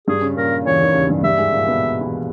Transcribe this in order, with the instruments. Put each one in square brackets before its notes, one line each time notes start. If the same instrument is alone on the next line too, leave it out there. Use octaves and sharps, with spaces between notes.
[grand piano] G2 G3 [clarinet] G#4
[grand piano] C#3 C#4
[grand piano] A#2 A#3 [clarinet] A#4
[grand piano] E2 E3 [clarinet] C#5
[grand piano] D#2 D#3
C#2 C#3
G2 G3
[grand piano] G2 G3 [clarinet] E5
[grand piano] G#2 G#3
A#2 A#3
B2 B3
E3 E4